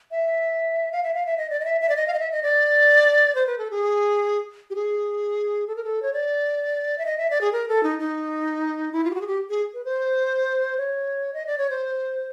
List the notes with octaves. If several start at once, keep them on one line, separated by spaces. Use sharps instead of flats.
E5
F5
E5
F5
E5
D#5
D5
D#5
E5
E5
D5
D#5
F5
D#5
E5
D#5
D5
C5
B4
A4
G#4
G4
G#4
A4
A#4
A4
C#5
D5
E5
D#5
E5
D5
G#4
A#4
A4
D#4
D#4
E4
F4
G4
F#4
G#4
G4
G#4
B4
C5
C#5
D#5
D5
C#5
C5